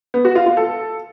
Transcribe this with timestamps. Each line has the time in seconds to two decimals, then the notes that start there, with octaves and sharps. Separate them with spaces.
0.14 B3
0.25 F#4
0.35 F4
0.46 F4
0.57 A4